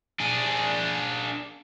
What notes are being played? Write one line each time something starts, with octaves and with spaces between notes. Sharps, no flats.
D4 G#4